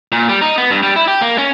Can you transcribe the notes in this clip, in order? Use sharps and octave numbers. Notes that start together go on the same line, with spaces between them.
A#2
G3
D#4
B3
G2
G3
E4
G4
A#3
C#4